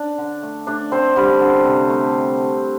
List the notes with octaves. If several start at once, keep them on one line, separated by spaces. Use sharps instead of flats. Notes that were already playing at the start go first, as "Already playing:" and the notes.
Already playing: D4 D5
D3
A3
A3 D4 D5
A3 C4 C5
D3 G3 G4
D3
C3
A3